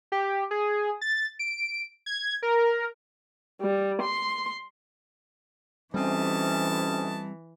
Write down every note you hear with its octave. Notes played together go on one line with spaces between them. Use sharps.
G4
G#4
A6
D7
G#6
A#4
G3
C6
D2 C3 E3 G3 C4 C#4 D#5 A5